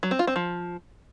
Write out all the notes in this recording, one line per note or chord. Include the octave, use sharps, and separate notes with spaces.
F#3
C4
F4
C4
F3